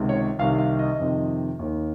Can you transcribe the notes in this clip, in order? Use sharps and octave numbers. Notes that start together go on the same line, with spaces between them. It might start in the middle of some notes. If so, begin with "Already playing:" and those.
Already playing: C#2 C3 D#3
C#5
C2 C3 D#3 F5
F5
D#5
F2 C3 D#3
D#2 D#3